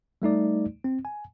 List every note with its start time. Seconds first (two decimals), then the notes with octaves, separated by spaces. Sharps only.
0.22 G3 A3 D#4 D5
0.84 C4
1.05 G#5